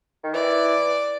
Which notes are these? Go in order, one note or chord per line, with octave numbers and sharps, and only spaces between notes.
D#3
E3 D5